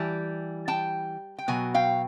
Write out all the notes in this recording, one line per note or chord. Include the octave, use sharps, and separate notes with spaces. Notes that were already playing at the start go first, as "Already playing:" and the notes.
Already playing: E3 G3 A5
G5 A5
G5
B2 F#3 G#5
F5 G5